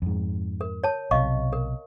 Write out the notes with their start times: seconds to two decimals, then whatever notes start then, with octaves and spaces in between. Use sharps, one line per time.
0.02 F2 G#2
0.61 A#4
0.84 C#5 A5
1.11 B1 C3 D#5 F5 C#6
1.53 A#4